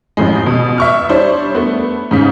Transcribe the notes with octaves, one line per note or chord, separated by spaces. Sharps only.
A1 F2 A2 G#3
B2
E5 C#6 F6
G3 D4 C5 C#5
A3 B3
G#2 C#3 B6